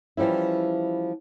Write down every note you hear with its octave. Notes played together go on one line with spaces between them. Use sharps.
E3 F3 G3 C#4 E4